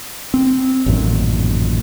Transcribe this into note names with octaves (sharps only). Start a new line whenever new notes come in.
C4
A1 F#2 A#2 D#3